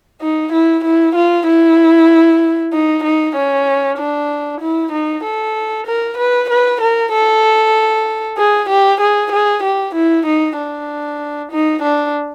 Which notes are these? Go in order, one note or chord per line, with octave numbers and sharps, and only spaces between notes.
D#4
E4
E4
F4
E4
D#4
D#4
C#4
D4
E4
D#4
A4
A#4
B4
B4
A#4
A4
G#4
G4
G#4
G#4
G4
E4
D#4
D4
D#4
D4